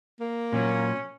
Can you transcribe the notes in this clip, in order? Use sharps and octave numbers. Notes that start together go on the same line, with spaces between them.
A#3
A#2 F#3 C#4